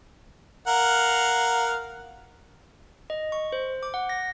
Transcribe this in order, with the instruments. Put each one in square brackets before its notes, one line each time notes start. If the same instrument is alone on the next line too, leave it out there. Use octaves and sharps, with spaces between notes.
[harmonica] A#4 F5 F#5
[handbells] D#5
C#6
C5
D6
F#5
A#6